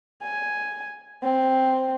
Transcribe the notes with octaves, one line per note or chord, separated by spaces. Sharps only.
G#5
C4